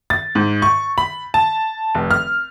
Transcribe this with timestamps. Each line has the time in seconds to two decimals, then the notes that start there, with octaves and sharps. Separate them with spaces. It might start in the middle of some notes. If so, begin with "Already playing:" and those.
0.10 A6
0.35 G#2
0.62 C#6
0.98 B5
1.34 A5
1.95 F1
2.11 F6